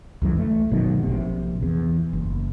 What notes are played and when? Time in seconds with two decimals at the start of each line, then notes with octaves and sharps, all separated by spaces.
0.22 C#2 F#2 E3
0.39 A3
0.70 G1 B2 D#3 F#3
1.03 A#1 C3
1.63 E2
2.13 F#1